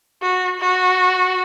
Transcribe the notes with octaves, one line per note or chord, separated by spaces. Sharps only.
F#4
F#4